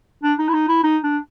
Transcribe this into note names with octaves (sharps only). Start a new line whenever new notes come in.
D4
D#4
E4
D#4
E4
D#4
D4